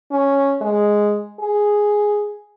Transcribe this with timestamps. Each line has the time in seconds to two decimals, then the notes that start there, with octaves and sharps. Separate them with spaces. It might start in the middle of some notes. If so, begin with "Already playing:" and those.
0.12 C#4
0.61 G#3
1.40 G#4